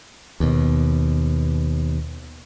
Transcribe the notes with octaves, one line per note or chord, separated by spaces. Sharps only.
D#2 B2